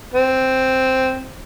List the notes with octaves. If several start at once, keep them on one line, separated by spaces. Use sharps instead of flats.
C4